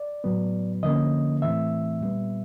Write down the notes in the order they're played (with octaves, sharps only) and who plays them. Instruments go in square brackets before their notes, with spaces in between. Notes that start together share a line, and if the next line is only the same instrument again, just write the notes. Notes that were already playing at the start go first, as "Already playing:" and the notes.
Already playing: [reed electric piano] D5
A2 F#3 B3
D3 F3 A#3 C#4 D#5
A2 E3 A3 C4 E5
A#2 G3 B3